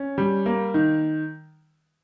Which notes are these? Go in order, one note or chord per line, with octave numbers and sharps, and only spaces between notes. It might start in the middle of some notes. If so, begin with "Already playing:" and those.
Already playing: C#4
G3
A#3
D#3